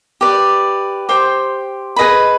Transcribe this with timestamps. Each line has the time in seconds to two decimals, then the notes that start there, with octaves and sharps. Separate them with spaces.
0.21 G4 B4 D5
1.09 G4 C5 G5 C6
1.96 G#4 B4 D#5 B5